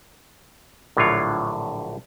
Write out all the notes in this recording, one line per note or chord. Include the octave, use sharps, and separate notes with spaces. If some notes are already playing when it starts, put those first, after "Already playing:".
A#1 A2 D3 F#3 F4 C#5